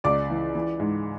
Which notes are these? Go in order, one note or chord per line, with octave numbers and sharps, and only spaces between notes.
C#2 D5 D6
E3
E3
G#2